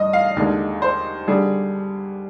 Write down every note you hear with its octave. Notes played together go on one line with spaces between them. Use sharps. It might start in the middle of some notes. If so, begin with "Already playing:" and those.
Already playing: G2 D#5
F5
D#2 D3 G#3
C5
D3 G3 G#4